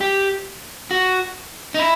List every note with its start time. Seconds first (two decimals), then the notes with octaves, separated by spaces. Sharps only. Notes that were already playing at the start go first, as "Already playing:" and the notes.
0.01 G4
0.91 F#4
1.74 D#4
1.79 E4